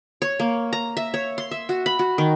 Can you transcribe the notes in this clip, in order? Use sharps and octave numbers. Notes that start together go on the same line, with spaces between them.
C#5
A#3
A#5
E5
C#5
C6
E5
F#4
B5
F#4
D#3